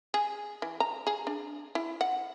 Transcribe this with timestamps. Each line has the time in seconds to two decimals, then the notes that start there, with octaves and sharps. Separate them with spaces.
0.14 G#4
0.62 E3
0.80 A#5
1.07 G#4
1.27 D4
1.75 E4
2.01 F#5